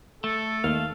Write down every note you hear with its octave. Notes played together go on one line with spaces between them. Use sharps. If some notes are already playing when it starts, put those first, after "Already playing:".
A3 A4
D#2 A#3 F5